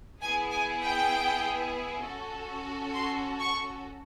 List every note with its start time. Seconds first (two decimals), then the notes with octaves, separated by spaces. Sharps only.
0.21 B3 E4 G#4 G#5
0.51 G#5
0.82 G5
2.02 C#4 F#4 A4
2.94 C6
3.39 C#6